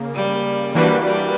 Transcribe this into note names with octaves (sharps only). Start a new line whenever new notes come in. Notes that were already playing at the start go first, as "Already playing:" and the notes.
Already playing: C#3 A#3
G3
E3 G3 A#3 D4 F#4 B4
G3